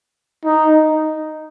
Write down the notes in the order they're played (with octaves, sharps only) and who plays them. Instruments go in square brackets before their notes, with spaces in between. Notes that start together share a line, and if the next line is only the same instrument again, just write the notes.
[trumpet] D#4